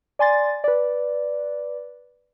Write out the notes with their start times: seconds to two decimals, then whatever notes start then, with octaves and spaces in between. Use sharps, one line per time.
0.19 D5 G#5 C6 A6
0.64 B4 D5